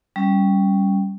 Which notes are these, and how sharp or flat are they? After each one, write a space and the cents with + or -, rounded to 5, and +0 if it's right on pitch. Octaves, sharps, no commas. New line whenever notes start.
G3 +0 C#4 +5